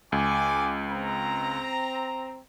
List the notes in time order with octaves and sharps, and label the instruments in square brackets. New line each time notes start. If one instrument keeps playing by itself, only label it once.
[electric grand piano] C#2 [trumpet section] G#5 D6
[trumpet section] C4 A#5